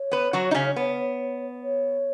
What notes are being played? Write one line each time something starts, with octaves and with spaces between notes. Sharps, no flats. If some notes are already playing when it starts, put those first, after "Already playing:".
Already playing: C#5
B3 B4
F#3 F#4
D#4
C#3 C#4
B3
C#5